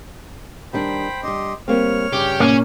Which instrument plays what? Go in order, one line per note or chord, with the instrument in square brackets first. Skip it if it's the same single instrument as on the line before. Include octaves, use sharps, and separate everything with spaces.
[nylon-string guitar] D#3 G3 D4 [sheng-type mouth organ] C5 G5 B5
[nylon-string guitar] G3 D4 [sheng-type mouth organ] G4 D#5 C6
[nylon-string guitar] G3 A#3 C4 [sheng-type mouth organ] C#5 F6
[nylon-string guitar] G2 C#3 [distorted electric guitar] G4
[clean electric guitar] A#2 A#3 [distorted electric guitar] C#4